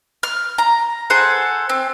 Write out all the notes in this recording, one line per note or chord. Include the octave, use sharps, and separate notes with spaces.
F6
A#5
G#4 A4 C5 F#5
C4